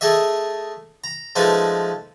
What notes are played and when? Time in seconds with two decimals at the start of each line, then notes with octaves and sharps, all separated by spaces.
0.01 A3 G#4 D#5 E5
1.04 A#5
1.36 F3 G#3 A3 D#4 B4